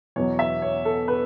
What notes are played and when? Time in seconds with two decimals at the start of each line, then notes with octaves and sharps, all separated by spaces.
0.16 E2 B2 F#3 C#5
0.39 E5
0.62 C#5
0.85 A4
1.08 B4